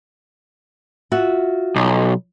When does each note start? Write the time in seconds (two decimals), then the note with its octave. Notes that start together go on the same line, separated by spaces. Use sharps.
1.12 F4 F#4 E5
1.76 B1